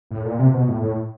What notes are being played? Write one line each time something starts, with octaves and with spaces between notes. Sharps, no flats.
A2
A#2
C3
B2
A2
A2